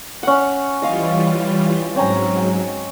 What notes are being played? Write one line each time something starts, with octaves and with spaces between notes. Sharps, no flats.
C#4 F#5
E3 G3 F4 D#5 F5 C#6
G#2 F#3 C4 C#4 A#5